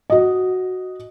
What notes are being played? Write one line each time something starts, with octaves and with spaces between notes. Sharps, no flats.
F#4 D#5